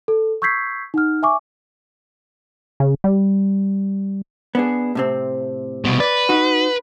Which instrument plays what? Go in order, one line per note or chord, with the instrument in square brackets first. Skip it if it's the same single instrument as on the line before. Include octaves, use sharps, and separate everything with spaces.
[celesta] A4
C#6 E6 G6 G#6 B6 C7
D#4 F#5 F6
E5 G#5 C#6 D6
[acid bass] C#3
G3
[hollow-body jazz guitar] B3 D4 G#4
A2 C3 C4
[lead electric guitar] C2 B2
[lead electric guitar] B4 [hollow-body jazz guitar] D5
[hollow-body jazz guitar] D#4 F#4